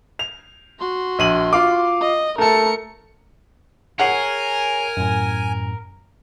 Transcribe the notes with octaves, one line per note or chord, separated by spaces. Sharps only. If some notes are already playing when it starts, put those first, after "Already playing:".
F7
F#4 C6
A#1 D#7 F#7
F4 F5 D6
D#5
A3 A4 A#4 C#7
G#4 A#4 C#5 F#5 G#5 C7
F#2 A2